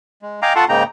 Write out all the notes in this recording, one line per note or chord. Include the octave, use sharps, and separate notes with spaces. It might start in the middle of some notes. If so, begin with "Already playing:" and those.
G#3
D#5 F5 G5 G#5 A#5 D6
F4 A4 F#5 A5 C6 C#6
G#2 C#3 A#3 D#4 G5 A#5